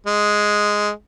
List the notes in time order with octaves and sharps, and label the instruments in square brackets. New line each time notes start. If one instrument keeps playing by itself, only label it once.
[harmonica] G#3